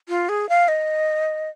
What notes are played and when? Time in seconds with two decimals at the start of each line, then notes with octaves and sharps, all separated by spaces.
0.09 F4
0.29 G#4
0.49 F5
0.68 D#5